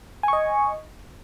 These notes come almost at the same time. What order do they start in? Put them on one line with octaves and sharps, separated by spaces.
G#5 C#6 D#5